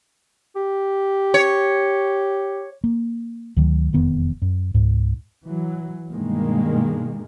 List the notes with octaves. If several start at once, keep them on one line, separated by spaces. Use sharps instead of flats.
G4
C#5
A#3
D2 D#3 F#3
E1 F2 D#3 B3
F#2
C#2 G#2
E3 F#3
G2 B2 D#3 G#3 A#3